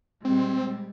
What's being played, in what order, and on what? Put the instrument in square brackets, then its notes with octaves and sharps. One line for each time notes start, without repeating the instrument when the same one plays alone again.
[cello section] A#2 G3 G#3 [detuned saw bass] C4